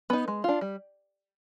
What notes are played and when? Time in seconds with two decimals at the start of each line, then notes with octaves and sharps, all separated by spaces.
0.10 B3 D#4
0.28 G#3
0.44 D4 F4
0.61 G3